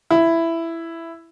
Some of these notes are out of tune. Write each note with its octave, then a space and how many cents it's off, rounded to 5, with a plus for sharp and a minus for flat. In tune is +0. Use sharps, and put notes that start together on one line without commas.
E4 +10